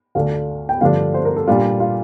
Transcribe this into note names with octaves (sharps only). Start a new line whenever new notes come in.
D2 D3 A3 D4 F5
G5
G2 D3 F3 A3 D4 F5
C5
A#4
A4
A#2 G3 D4 F4
F4